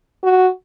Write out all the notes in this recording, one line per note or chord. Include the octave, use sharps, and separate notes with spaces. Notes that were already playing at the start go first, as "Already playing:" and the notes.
F#4